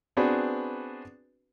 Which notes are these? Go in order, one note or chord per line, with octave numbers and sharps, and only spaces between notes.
B3 C4 D4 F#4 G#4 B4